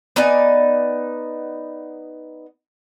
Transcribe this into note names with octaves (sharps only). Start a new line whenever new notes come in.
B3 D#4 D5 G#5